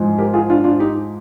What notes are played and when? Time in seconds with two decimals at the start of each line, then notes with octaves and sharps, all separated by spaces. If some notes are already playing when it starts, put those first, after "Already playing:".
Already playing: G#2 F3 G#3
0.18 G4 A#4
0.33 F4 G#4
0.49 D4 F4
0.64 D4 F4
0.79 D#4 G4